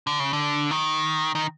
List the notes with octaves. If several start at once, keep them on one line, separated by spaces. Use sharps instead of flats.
D3
C#3
D3
D#3
D#3